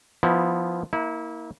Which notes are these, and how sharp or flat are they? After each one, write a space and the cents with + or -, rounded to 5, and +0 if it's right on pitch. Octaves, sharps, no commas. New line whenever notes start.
F3 +0 B3 +0 E4 -20
A#3 +0 E4 -30